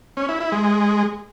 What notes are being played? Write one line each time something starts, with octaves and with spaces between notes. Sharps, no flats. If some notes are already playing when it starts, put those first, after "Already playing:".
C#4
E4
E4
G#3